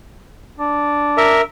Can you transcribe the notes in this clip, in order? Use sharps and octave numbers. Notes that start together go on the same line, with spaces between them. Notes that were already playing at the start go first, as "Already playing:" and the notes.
D4
A#4 E5